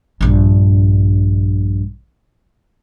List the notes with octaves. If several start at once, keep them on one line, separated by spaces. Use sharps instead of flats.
A#1 G2